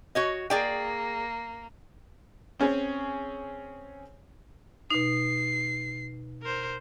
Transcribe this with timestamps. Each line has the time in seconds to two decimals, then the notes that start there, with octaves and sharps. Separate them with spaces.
0.15 F#4 C#5 D#5
0.50 A#3 G#4 D5 G5
2.60 C4 C#4 G#4 C#5
4.91 B2 D#4 C7
6.42 A#4 C5